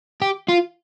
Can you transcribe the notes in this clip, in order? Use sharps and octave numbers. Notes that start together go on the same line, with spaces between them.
G4
F4